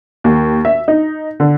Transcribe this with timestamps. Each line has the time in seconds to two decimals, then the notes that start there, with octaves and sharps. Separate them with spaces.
0.24 D#2
0.65 E5
0.88 D#4
1.40 D3